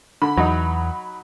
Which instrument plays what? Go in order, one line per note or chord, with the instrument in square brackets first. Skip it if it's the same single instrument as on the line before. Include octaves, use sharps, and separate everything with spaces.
[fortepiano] D3 [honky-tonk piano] B5
[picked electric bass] E2 [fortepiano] F#3 D#4